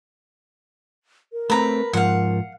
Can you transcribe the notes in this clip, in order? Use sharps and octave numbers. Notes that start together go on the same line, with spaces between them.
A#4
A3 C4 B4 A#5
G#2 F3 F5 F#5